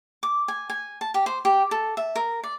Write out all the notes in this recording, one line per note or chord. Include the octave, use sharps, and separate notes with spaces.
D6
G#5
G#5
A5
G4
C5
G4
A4
E5
A#4
D5